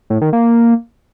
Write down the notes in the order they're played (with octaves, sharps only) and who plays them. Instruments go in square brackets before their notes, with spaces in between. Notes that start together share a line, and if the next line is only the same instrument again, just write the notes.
[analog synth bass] A2
D#3
A#3